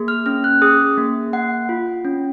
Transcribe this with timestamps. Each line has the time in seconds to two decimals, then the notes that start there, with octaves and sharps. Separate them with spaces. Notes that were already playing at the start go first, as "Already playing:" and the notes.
Already playing: A#3 G#4
0.08 F6
0.26 C#4 F6
0.44 F#6
0.62 G#4 D#6
0.98 A#3
1.33 A#3 F#5
1.69 F4
2.05 C#4